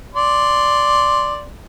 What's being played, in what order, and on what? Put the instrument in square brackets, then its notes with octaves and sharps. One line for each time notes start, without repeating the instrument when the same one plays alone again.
[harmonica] D5 C6